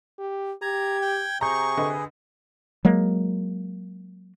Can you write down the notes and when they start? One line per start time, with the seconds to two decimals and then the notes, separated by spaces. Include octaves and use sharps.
0.19 G4
0.62 G4 A#5 G#6
1.02 G5
1.41 C3 G#4 A#5 C#6 G6
1.77 D3 B4 D#5
2.85 F#3 G#3 A#3